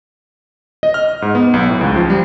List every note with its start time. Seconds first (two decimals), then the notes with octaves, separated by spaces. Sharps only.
0.83 D#5
0.94 F6
1.22 G#2
1.35 B3
1.54 B1
1.69 A2
1.81 C#2
1.96 F3
2.10 G3